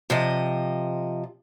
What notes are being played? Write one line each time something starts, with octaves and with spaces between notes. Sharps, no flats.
C3 F3 D#5